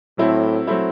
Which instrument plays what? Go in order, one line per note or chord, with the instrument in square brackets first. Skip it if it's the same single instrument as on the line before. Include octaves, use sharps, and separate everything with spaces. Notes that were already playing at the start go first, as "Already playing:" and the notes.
[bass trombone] A2 [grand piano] F#3 A3 C4 E4
[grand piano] F#3 A3 C4 E4